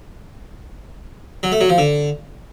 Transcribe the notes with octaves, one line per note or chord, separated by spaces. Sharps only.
F#3
A3
F#3
F3
D3